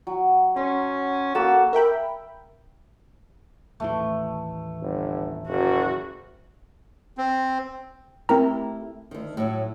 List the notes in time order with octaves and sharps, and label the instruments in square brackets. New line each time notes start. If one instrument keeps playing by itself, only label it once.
[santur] F#3
[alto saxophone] C#4 [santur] C6
[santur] A#3 F#4 [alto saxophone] A4
[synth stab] A#4 E5 G5 B5
[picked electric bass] D#1 A1 E3 [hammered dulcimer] A3
[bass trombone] G1
[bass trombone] F#1 [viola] F#4
[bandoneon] C4
[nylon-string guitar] A3 E4 G4 [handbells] C4 A#4 A#5
[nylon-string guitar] D2 D#3
A2 F#3